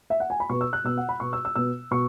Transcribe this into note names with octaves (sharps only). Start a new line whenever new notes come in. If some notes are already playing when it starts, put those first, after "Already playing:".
E5
F#5
G#5
B5
B2 B3 C#6
E6
F#6
B2 B3 E6
F#5
B5
B2 B3 C#6
E6
E6
B2 B3 E6
B2 C#6